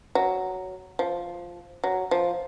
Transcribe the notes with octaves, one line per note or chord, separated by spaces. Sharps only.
F#3
F3
F#3
F3